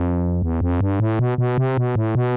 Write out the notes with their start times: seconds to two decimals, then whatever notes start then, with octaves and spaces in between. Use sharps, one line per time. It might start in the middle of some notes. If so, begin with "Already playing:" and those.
Already playing: F2
0.42 E2
0.61 F2
0.81 G2
1.00 A2
1.19 B2
1.38 B2
1.58 C3
1.78 B2
1.96 A2
2.15 B2